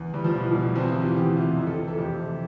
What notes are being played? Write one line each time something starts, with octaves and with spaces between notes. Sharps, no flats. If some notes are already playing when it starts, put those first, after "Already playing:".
Already playing: E2
E2 G3
F3
B2 E3
F3
B2
F3
E2 C4
F4
E4
E3 G4
F4
E2 G4
C3 F4
F2
A4
E3
A4
F2 G4
C3